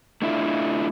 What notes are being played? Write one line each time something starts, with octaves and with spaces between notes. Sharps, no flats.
A3 D4 E4 F4